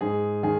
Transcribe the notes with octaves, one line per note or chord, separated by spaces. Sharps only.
G#2 G#4
D#3 G#4